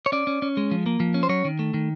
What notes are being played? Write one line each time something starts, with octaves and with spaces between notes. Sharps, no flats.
C#5
C#4 D5
C#4
C#4
G#3
F3
A#3
F3
C#4
C5
F#3 C#5
D#3
A3
D#3